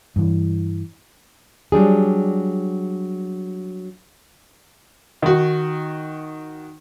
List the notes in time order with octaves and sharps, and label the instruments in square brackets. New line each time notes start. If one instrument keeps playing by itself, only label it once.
[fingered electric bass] G2 E3
[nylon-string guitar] F#3 G3 D4 G#4
[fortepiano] D#3 F#4